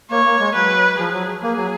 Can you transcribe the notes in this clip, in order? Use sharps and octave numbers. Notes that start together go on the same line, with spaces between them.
A#3 C#5
A#3
G#3
F#3 B4
F3 G#4
F#3
A#3 G#4
F#3